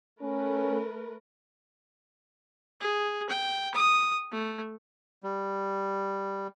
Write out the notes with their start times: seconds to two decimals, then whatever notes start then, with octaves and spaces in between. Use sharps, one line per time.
0.22 A3 C#4 A#4 B4
2.81 G#4
3.29 G5
3.75 D#6
4.32 A3
5.23 G3